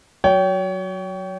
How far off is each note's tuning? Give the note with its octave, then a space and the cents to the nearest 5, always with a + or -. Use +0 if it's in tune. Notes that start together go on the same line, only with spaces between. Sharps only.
F#3 +0 C#5 +30 G5 -20